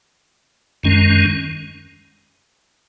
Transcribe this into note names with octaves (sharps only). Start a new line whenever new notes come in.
F#2 D#3 G#3 C#4